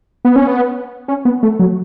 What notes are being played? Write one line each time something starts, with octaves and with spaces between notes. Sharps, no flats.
B3
C#4
B3
C#4
B3
A3
F#3